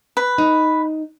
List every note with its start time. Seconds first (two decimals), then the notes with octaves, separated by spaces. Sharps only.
0.17 B4
0.38 D#4